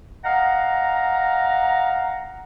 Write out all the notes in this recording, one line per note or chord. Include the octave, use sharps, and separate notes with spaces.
D#5 F5 F#5 A#5